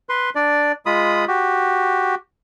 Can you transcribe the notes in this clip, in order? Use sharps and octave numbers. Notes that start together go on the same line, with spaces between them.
B4 C6
D4 D5
G#3 F4 B5 D#6
F#4 G4